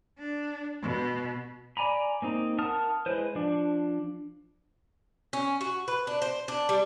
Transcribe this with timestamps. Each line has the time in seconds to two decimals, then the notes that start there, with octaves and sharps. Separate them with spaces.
0.19 D4
0.82 B2
1.77 D5 G#5 A#5 B5
2.22 A#3 C4 D#4
2.58 A#4 F#5 A5 D#6 F6
3.06 G#3 E4 B4 C5
3.35 F3 D4
5.33 C#4
5.61 F#4
5.88 B4
6.07 D4
6.22 C5
6.48 D4
6.69 G3